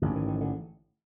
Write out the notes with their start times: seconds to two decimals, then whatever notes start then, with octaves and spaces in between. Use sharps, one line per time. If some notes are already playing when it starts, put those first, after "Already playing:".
0.02 A1 G#2 D3
0.16 D#3
0.28 D#3
0.41 D3